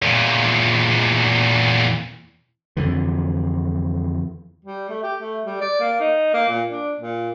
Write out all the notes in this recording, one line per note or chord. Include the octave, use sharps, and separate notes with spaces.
E2 A#2
F2 D3 E3
G3
A3
G4
A3
G3
D5
A#3
D#4
A#3
A#2
D4
A#2